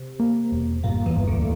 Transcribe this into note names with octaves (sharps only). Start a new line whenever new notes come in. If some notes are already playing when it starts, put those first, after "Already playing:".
Already playing: C3
A#3
E1
G1 A#2 A#3
E2 E3
G1
D2 D3